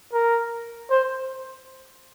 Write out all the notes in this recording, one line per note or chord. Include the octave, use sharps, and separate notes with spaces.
A#4
C5